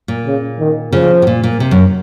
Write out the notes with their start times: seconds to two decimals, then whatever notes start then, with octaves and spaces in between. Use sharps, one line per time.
0.08 A#2
0.25 C#3
0.59 D#3
0.93 C#3 F3
1.22 C3
1.27 A#2
1.44 A#2
1.60 C3
1.71 F#2